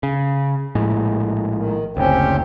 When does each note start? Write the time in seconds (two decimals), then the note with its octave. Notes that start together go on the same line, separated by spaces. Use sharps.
0.03 C#3
0.75 A#1 A2 G#3
1.55 D#3
1.97 F#1 D2 C4 C#4 G4